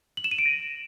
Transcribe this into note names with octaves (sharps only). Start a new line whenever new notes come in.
F#7
E7
D#7
D7
A#6